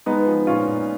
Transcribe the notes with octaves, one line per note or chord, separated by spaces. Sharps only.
G#3 B3 D#4
F3
A#2 C#4 F4
A#2